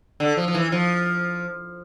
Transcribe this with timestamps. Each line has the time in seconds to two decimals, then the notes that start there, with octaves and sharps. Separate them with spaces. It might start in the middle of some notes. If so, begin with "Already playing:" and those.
0.20 D3
0.37 F3
0.48 F3
0.54 E3
0.72 F3